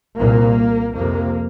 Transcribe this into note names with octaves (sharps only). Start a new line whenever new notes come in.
C2 A#2 A#3
F2 C3 A#3